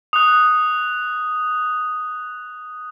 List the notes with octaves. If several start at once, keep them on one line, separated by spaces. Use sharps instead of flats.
D#6 F#6